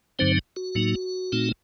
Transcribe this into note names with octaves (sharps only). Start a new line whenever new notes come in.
G2 D3 F#3 C4 D#4 C5
F#4
A2 F#3 A#3 D#4
A#2 A3 C4 D#4